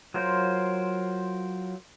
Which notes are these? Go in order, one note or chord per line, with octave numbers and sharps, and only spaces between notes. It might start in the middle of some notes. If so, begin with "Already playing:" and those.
F#3 F4 A#4 C5